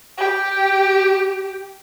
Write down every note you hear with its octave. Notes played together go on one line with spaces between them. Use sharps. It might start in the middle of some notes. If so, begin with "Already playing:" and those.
G4